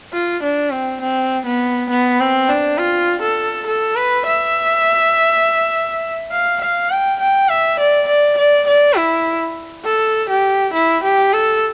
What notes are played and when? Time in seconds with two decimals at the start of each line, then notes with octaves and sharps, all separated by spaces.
0.13 F4
0.43 D4
0.72 C4
1.01 C4
1.46 B3
1.90 B3
2.20 C4
2.49 D4
2.78 F4
3.22 A4
3.67 A4
3.96 B4
4.26 E5
6.32 F5
6.61 F5
6.91 G5
7.21 G5
7.49 E5
7.80 D5
8.08 D5
8.38 D5
8.67 D5
8.97 E4
9.85 A4
10.30 G4
10.73 E4
11.04 G4
11.33 A4